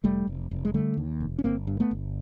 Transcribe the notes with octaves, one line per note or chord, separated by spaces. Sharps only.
F1 G3 A3
F1
F1
G#3
D3 G3 A3
D#2
F1
C#4
G1 A#3 C4
G2
A3 B3
G1